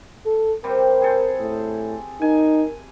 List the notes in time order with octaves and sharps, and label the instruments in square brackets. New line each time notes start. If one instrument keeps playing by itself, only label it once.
[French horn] A4
[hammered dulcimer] C3 G3 C5 [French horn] A#4
[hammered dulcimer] G#4 A4 C5
[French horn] A2
[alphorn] D#4 [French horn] A#4 [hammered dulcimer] G#5